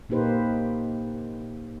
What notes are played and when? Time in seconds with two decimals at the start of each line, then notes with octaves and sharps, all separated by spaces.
0.09 A#2 A#3 D#4 G4 B4 C5